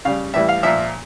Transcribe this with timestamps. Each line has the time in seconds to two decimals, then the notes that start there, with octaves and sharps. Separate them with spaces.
0.05 C#3 G3 F5
0.34 A2 E3 G3 E5
0.49 F5
0.63 A#2 F3 E5